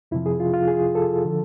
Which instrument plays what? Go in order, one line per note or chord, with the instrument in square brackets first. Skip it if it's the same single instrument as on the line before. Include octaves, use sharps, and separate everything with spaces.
[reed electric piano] F2 C3 F3 E4
G#4
F4
F4
G#4
A4
D3 F3